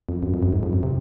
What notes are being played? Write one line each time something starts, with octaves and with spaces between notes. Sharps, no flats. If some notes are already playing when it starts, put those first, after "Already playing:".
F2
F#2
F2
F#2
G#2
F2
F#2
C3